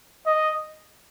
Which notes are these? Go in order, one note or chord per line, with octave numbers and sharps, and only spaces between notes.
D#5